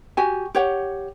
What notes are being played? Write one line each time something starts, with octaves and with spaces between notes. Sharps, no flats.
F#4 G4 G#5
G4 C#5 F#5